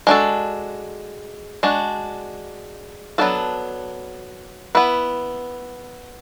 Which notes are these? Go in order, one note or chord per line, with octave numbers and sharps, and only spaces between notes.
G#3 D4 F#4 A4
G#3 D4 F#4
F#3 B3 D4 F#4 A4
B3 E4 B4